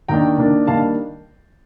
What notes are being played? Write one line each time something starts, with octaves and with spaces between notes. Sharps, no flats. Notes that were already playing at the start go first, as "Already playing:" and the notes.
D#2 D#3 A#3 D4 G5 A#5
D#2 D#3 A#3 D4
D#3 G3 A#3 D4 F5 A5